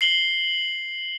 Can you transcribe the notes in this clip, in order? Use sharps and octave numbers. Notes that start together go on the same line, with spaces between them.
C7 F#7 G7